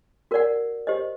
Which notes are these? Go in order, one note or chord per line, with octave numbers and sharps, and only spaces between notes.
F#4 A#4 D5 F#5
G4 C5 D#5